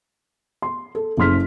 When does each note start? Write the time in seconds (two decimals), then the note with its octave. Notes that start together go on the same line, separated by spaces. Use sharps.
0.62 C6
0.95 A4
1.17 F#1 C#3 C6 F6 B6